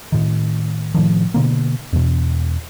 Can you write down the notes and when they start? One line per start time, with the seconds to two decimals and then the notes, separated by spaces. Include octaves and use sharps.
0.12 A2 D#3
0.95 A2 D#3 F3
1.34 B2 D3 A#3
1.93 E2 B2